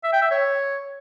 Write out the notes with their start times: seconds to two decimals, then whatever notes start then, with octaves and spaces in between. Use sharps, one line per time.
0.04 E5
0.13 G5
0.22 E5
0.31 C#5